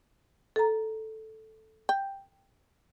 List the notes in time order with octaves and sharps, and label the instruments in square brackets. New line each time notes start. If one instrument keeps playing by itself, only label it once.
[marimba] A4 A#5
[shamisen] G5